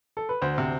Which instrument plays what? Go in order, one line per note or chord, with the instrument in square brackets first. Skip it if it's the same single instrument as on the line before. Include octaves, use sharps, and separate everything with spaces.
[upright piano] A4
B4
[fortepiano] D2 [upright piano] C5
[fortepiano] C3